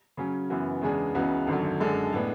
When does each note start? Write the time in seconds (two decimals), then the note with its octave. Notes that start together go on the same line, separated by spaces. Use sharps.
0.17 C#3 F#3 C#4
0.50 F#2 C#3 E3 B3 F#4
0.82 E2 C#3 G#3 D4 G#4
1.15 C#2 C#3 E3 B3 F#4
1.47 G#1 F#2 D3 F#3
1.80 F#2 D3 G#3 D4 A4
2.13 A2 G#3 B3 D4